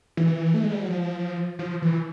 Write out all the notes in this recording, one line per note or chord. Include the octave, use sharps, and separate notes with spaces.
E3
A3
G#3
G3
F#3
F3
F3
E3